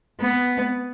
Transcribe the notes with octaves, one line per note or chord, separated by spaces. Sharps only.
B3